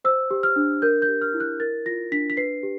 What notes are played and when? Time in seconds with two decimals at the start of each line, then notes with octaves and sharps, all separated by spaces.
0.05 C5 E6
0.31 G4
0.43 F6
0.56 D4
0.82 A#4 G6
1.02 G6
1.08 G4
1.22 F6
1.34 E4
1.40 F#6
1.60 A#4 A6
1.86 F4 A#6
2.12 D4 B6
2.30 B6
2.37 B4 C7
2.63 G4